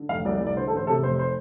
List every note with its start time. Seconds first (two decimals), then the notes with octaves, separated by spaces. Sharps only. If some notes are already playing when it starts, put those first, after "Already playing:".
Already playing: D3
0.09 F1 F5
0.25 C2 D5
0.35 D5
0.41 C2
0.47 D5
0.56 D3 C5
0.67 A4
0.72 A1 C5
0.87 C3 A4
1.03 F1 C5
1.19 C5